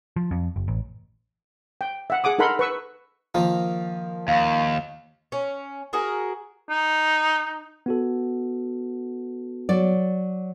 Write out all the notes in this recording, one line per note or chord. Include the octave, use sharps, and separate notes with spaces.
F3
F2
F#1
A1
G5
E5 F#5
G#4 F#5 D6 D#6
D#4 A4 A#4 F#5 B5 C6
B4 C#6 E6
D#3 F3 A#3
D#2 F5
C#4
F#4 G#4 A#4
D#4
B3 F#4 A4
F#3 D5